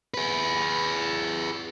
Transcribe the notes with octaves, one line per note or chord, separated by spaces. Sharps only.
G#4 B4